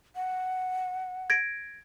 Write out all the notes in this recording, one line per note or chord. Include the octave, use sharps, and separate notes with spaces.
F#5
G#6 A#6 D7